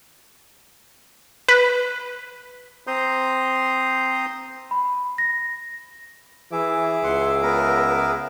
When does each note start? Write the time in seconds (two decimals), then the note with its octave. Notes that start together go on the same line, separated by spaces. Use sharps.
1.48 B4
2.87 C4 C5 A#5 C6 D#6 G6
4.71 B5
5.18 A#6
6.52 E3 G#4 E5 D6
7.04 C#2 F#5 C6
7.42 B3 A#4